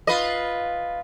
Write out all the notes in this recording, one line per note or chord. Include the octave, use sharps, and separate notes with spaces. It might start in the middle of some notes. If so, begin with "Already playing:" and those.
F4 B4 D#5